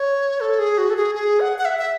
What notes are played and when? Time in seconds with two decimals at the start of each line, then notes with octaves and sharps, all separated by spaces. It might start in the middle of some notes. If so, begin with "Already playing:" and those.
Already playing: C#5
0.40 A4
0.59 G#4
0.78 F#4
0.90 A4
0.96 G#4
1.15 G#4
1.40 F#5
1.58 F#5
1.65 E5
1.79 E5